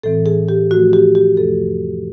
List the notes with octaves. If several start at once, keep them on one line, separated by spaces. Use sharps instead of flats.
A2 E3 G#3 C4 A4
G#4
G4
A2 F3 A3 F#4
G4
G4
F2 C3 F3 A3 A4